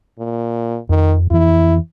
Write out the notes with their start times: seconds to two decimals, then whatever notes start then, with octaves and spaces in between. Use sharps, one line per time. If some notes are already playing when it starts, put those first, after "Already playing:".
0.19 A#2
0.89 F2 D#3
1.31 F2 E3 E4